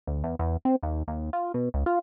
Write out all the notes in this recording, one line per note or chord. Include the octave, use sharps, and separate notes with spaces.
D2
E2
E2
C4
D#2
D#2
F4
B2
C#2
F4